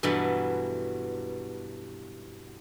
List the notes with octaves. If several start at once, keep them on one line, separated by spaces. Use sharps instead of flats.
G2 B2 E3 F#3 A4 F#5